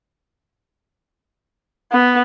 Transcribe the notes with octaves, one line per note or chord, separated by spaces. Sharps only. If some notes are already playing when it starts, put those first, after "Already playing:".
B3